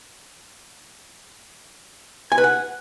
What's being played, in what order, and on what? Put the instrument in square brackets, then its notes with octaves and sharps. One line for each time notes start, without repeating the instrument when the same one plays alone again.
[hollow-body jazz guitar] G#5
B4
F#5